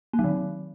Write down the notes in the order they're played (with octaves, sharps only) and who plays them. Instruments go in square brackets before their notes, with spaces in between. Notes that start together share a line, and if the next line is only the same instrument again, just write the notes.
[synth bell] A#3
F#3
D#3